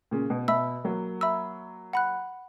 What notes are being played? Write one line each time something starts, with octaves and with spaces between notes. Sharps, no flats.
A#2 C#3
B2
B2 E5 B5 E6
F#3 A#3
E5 B5 E6
F#5 B5 F#6